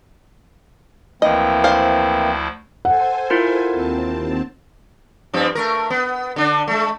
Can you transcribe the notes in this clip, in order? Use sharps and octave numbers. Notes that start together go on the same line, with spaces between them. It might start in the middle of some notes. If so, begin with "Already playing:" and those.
D2 E3 F3 A#3 C4 E4 D#5
D4 C5 F5
A4 C5 F#5 G#5
E4 F4 A#4
D#2 C4 A5
G2 F3 C4
A3 A#4
B3
D3 D4
G#3 A3